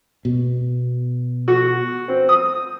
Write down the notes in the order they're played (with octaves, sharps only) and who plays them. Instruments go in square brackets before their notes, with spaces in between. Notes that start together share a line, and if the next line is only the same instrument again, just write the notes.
[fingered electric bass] B2
[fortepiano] F#4
C4
D#6